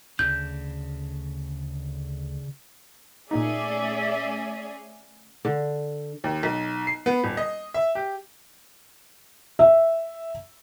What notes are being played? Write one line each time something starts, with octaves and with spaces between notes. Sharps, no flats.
D2 C#3 D4 G6
A#2 A3 A#3 C#4 D#4 G#4 D5 E5
D3
D#2
B1
C7
B3
D#1
D#5
E5
G4
E5